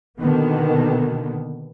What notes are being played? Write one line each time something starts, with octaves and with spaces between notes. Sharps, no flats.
B2 D3 D#3 A#3 B3